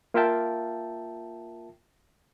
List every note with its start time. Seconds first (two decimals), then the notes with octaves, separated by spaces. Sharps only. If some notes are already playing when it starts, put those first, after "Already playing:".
0.14 A#3 F4 A#4 E5 G5 A5